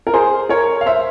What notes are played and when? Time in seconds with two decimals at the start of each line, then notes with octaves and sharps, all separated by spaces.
0.07 A#4
0.14 G#4 C5
0.49 A#4 C#5
0.81 F5
0.86 C5 E5